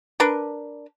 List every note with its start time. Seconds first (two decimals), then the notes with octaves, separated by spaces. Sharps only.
0.20 D4 A#4 B4